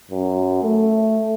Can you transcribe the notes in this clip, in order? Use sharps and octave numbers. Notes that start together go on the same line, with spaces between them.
F#2
A3